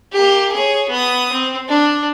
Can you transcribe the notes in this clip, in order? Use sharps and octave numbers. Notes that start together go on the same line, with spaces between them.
A#3 G4
G#4 C#5
B3 D#6
C4
D4